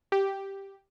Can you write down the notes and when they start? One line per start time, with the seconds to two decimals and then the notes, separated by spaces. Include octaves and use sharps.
0.12 G4